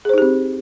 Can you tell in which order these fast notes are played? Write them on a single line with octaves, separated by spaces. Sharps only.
G#4 C5 D#4 G4 C4